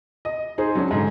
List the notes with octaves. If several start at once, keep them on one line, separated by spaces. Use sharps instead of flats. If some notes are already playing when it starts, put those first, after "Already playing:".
D#5
D#4 G#4 C5
F#3 C#4 D4
G#2 D3